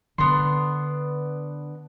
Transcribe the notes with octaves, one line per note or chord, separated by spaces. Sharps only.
D3 B3 D4 C6